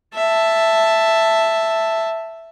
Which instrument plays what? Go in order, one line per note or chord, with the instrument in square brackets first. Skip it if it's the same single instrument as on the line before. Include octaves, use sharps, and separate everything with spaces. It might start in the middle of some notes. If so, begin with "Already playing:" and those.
[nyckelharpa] E5 A5